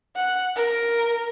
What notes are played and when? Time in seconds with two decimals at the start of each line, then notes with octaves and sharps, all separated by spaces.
0.16 F#5
0.56 A#4